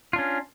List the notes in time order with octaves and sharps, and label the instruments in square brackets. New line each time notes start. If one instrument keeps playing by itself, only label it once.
[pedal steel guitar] F4
D4
C#4